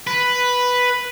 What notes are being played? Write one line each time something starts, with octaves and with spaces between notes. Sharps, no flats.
B4